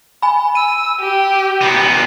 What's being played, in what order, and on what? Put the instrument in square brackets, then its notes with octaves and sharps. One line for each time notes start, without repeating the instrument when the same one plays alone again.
[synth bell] G#5 B5
[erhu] E6 [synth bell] D#7
[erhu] G4
[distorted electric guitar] A#2 B3